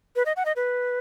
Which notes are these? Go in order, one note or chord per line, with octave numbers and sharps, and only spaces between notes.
B4
D#5
F#5
D#5
B4